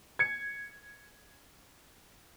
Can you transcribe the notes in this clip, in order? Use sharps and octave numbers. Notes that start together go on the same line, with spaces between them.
G#6 C#7